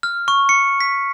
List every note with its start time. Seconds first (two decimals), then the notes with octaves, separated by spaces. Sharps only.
0.03 F6
0.28 C#6
0.49 C#7
0.80 B6